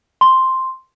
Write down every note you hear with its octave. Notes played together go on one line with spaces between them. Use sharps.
C6